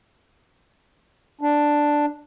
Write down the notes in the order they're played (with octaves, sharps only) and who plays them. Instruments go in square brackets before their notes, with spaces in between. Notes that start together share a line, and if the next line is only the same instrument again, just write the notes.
[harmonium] D4